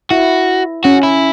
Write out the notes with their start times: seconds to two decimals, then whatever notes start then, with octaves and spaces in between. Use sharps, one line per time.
0.10 E4 F#4
0.84 C#4 F#4
1.03 E4